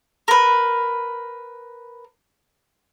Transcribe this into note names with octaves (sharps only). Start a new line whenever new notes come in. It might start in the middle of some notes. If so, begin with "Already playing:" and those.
A#4 B4